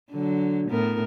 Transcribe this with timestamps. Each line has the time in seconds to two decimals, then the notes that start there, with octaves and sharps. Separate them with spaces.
0.11 D3 F#3
0.70 A2 B3 A#4